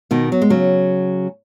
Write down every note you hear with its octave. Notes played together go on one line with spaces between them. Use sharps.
B2 D#3
F#3
G#3
C#3 F#3